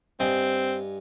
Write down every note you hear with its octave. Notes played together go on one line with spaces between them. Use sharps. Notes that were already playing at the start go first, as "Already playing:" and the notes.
G2 C4 D#5 G#5